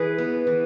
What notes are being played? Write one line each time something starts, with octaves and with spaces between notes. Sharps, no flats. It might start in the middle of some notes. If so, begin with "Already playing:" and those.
Already playing: E3 G#4 B4
B3
E3